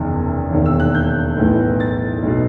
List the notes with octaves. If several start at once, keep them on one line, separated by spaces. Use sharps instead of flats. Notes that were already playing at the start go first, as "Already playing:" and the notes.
Already playing: F#1 E2 C3 D#3
E1 D#2 D#3
E6
F#6
G6
B1 A2 E3
A6
B1 B2